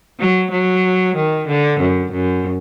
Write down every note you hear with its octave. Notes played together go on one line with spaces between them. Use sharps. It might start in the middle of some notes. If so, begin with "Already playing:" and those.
F#3
F#3
D#3
D3
F#2
F#2